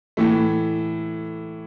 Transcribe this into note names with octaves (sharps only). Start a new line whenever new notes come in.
A2 E3 A3